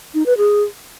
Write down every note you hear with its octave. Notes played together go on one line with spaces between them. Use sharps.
D#4
B4
G#4